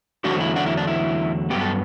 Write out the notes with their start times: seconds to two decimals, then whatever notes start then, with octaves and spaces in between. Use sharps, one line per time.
0.24 E2 D3 F#3 A3 D4 F#4
0.41 E4
0.56 D4 F#4
0.66 E4
0.77 D4
0.87 E4
1.50 G2 F#3 B3 G4
1.61 A4